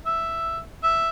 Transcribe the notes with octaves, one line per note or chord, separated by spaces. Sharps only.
E5
E5